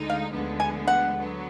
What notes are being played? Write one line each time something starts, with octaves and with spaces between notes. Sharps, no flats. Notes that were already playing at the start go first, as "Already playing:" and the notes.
Already playing: D2 D3 G#3 D#4
F5
D2 D3 F3 G#3 B3
G#5
F#5
D3 F#3 B3